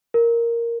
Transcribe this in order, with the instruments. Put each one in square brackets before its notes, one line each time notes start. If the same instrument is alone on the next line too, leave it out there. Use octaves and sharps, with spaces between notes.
[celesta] A#4